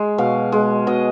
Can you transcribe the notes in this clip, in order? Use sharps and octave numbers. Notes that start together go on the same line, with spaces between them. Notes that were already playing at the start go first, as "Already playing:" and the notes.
Already playing: G#3
B2 F5
G#3
B2 D#5